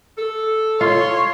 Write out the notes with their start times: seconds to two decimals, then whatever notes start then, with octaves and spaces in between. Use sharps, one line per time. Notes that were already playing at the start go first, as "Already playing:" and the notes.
0.17 A4
0.81 F4 C#5 C6